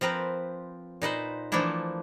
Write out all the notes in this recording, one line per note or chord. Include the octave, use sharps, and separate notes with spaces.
F3 C4 A#4 B4
A#2 D#4 B4 C5
E3 F3 A3 A#3 D4 E4